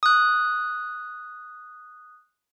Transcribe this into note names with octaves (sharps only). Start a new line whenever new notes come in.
D#6 F#6